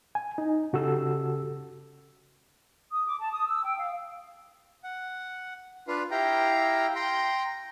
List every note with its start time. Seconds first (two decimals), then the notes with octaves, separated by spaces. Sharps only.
0.15 G#5
0.38 D#4
0.73 C#3 F#4 G4 A4 E6
2.91 D#6
3.07 D6
3.19 A5
3.31 D#6
3.47 E6
3.64 G5
3.78 F5
4.84 F#5
5.88 D4 F4 B4 F5
6.11 E4 G4 F5 G5 A#5
6.95 G5 A#5 C6